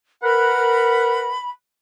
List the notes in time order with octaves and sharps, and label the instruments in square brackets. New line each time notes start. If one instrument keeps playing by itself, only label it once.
[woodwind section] A#4 B4 F#5 [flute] B5